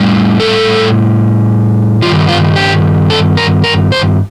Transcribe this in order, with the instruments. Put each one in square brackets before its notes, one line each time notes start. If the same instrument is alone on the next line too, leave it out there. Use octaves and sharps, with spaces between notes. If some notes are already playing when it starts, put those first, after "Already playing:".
Already playing: [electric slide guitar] A2 G3
A4
G2 D#3 G3 F4
F4
G4
A4
A#4
A#4
C5